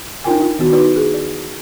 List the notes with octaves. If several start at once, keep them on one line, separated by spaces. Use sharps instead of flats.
D4 D#4 F4 A#4 G5 G#5
F4
D#3 B3 F#4
D#4 E4 F#4 B4 D5
G#4
D5